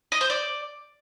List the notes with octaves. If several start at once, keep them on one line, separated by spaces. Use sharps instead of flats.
D#5
C5
D5